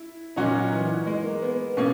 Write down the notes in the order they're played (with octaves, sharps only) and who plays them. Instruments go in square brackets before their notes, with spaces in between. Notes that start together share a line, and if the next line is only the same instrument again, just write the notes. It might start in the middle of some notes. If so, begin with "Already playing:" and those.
Already playing: [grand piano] E4
[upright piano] A#2 F#3 C#4 F#4 [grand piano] D#4
[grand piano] E3
G#3
A#3
B3
[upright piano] B2 A#3 [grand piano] C#4